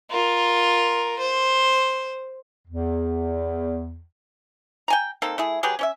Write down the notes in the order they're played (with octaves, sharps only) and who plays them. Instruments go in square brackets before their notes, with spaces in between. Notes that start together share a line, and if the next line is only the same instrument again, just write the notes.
[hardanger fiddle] F4 A#4
C5
[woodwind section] E2
[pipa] G5 G#5 A#5
A#3 C4 D#4 A4
A3 E4 G#4
F#3 G4 G#4 B4
C#4 C#5 E5